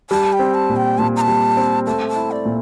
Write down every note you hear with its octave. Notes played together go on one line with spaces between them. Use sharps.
G3 A5
G5
C4
A5
A#2
G5
A#2 A5
A#5
A5
G3
C4
A3 A5
A5
E4
D5
A#2